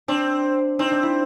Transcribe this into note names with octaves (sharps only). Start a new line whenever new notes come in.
C4 D4
C4 D#4
D4
E4